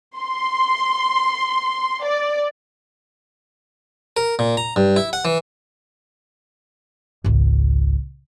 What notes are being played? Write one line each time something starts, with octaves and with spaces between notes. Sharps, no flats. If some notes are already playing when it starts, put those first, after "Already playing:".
C6
D5
A#4
A#2
A#5
G2
E4
F#5
E3
G#1 C#2